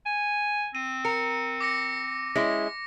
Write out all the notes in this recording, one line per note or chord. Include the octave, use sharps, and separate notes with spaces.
G#5
C4 D#7
A#4 C#7
D6 A#6 C#7
G#3 C#4 E4 A#6